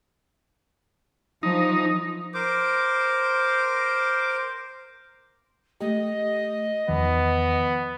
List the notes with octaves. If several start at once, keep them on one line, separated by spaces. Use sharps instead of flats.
F3 D#4
A#4 C5 D6
A3 G4 D#5
E2 D#3 F3 B3